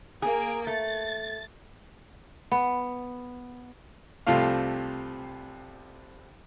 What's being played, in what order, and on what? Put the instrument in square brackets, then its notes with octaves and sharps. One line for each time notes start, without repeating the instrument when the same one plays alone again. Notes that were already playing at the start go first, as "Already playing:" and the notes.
[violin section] A#3 D7 [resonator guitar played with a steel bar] G#4
[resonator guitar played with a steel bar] A3 [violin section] A6
[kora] B3
[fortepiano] C2 C3 F3 A3 F4 F5